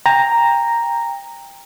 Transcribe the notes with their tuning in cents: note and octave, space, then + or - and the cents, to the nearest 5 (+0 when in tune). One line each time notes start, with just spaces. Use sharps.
G5 +25 A#5 +0